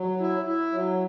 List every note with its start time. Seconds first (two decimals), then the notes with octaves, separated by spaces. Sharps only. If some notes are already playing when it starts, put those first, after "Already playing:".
Already playing: F#3
0.20 E4
0.45 E4
0.72 F#3